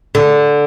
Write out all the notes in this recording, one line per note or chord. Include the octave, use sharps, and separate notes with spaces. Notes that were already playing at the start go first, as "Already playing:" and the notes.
D3